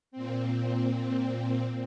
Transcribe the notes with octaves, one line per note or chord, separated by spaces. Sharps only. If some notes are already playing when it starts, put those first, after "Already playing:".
A#2 C4